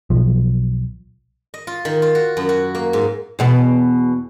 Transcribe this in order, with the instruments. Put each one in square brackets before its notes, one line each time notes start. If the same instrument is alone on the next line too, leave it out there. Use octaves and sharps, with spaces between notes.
[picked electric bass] B1 F3
[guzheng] D#5
F4
D#3
F4
F#4
F#2
F#4
A#3
G#2
[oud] E2 B2 B3